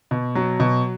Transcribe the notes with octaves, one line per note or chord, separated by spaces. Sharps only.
B2
F#3
B2